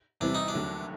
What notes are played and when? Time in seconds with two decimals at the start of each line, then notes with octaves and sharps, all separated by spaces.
0.21 E2 C3 E3 G3 C4 D4
0.35 D#4
0.48 D4
0.54 D#2 D3 F#3 A3